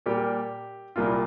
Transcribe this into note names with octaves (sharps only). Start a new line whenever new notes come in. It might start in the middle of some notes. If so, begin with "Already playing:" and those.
A#2 G3 A#3 G4
C2 A#2 G3 A#3 F4